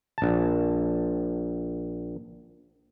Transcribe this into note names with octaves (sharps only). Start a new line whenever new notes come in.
A#1 A5